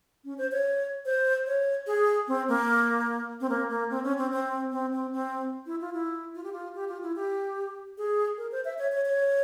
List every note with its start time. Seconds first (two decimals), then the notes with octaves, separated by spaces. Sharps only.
0.25 C#4
0.38 C5
0.52 C#5
1.05 C5
1.47 C#5
1.87 G#4
2.28 C4
2.48 A#3
3.41 C4
3.49 A#3
3.70 A#3
3.90 C4
4.04 C#4
4.17 C4
4.31 C4
4.72 C4
4.93 C4
5.13 C4
5.66 E4
5.81 F4
5.94 E4
6.35 F4
6.43 G4
6.52 F4
6.75 G4
6.88 F4
7.03 E4
7.16 G4
7.98 G#4
8.38 A#4
8.52 C5
8.65 E5
8.78 C#5
8.92 C#5
9.05 C#5